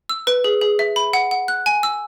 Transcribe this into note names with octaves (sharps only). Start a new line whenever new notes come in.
E6
B4
G#4
G#4
E5
B5
F#5
F#5
F#6
G#5
E6